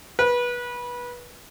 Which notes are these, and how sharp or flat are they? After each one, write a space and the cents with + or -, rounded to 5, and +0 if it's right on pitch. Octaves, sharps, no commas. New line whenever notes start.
B4 -25